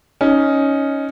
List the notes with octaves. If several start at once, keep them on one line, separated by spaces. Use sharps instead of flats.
C#4 D#4